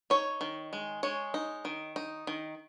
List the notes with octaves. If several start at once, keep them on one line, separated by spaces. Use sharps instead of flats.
D#4 C#5
D#3
G#3
G#3 C#5
D#4
D#3
D#4
D#3